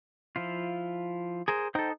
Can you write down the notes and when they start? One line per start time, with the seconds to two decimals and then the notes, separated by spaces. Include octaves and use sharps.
0.36 F3 E4 F4
1.48 G#4 A#4 C5
1.75 D#4 A4 C5 G5 D#6